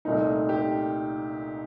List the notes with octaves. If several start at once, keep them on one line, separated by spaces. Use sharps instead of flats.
C2 A#2 A3 D#4
G4